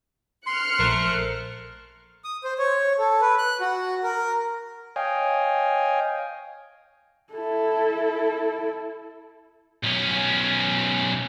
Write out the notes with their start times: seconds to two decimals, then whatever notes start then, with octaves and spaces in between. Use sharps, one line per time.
0.47 C6 F6 F#6 C#7
0.79 A#1 A3 A#4 C5
2.24 D#6
2.44 C5
2.58 C#5
2.99 A4
3.21 B4
3.38 F#6
3.60 F#4
4.04 A#4
4.96 C#5 D#5 F5 G5 G#5
7.33 E4 A4
9.84 B1 C#4